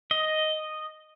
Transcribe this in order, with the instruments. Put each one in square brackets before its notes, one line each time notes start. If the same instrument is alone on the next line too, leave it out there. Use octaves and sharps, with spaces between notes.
[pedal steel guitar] D#5